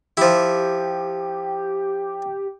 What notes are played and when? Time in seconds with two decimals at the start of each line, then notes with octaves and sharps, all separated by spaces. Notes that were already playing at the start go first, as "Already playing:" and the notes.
0.17 F3 E4 G4